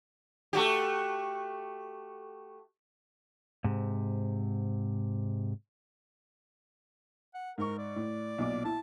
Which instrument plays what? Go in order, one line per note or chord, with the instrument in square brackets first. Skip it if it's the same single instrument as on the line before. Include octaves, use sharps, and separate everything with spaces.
[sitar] A3 F#4 G4
[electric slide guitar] G#2 C3
[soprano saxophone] F#5
[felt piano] G#2 C#6 [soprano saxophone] A#4
[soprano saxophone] D5
[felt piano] A2
B1 A#2 D6
[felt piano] E4 [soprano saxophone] A5